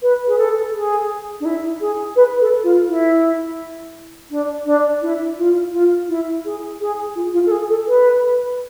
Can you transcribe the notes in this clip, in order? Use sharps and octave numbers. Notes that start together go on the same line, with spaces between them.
B4
G#4
A4
G#4
D4
E4
G#4
B4
A4
F4
E4
D4
D4
E4
F4
F4
E4
G#4
G#4
F4
F4
A4
G#4
A4
B4